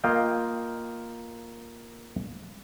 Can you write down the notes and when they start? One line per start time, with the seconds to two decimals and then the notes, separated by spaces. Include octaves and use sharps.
0.04 A#3 F4 D#5 F5 G5